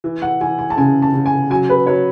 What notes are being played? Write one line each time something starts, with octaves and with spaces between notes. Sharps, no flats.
E3
F#5
E3 G#5
G#5
A5
C#3 G#5
A5
C#3
G#5
F#3 G#5
B4
F#3 C#5